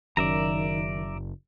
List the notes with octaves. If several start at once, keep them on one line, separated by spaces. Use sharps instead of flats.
F#1 F#2 D#3 D5 E5 A#5